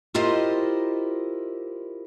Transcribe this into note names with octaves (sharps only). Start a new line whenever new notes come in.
E4 F4 G4 A#4 C5 D#5